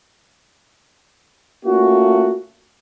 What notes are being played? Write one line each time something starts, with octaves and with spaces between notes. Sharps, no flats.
A3 A#3 C#4 F4 F#4